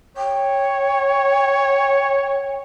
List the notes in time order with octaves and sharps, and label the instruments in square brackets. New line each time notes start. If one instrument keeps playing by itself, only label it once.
[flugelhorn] C#5 [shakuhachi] G5